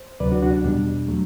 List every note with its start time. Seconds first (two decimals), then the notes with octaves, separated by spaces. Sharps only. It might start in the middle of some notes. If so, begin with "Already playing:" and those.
Already playing: C5
0.20 D2 C3 F#3 B4 D5
0.32 D4 F#4
0.42 D4 F#4
0.54 D4
0.64 E2 B2 G3 D4
1.08 F#3 A3